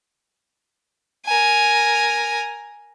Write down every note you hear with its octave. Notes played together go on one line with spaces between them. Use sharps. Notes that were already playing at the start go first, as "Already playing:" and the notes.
A#4 G#5